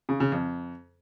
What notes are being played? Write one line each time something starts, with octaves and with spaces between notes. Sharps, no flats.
C#3
C#3
F2